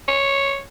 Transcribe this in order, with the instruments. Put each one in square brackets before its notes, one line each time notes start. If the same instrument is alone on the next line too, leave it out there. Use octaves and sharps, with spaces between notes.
[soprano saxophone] C#5